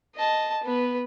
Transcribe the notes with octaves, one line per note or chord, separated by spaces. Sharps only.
D#5 A5
B3 B4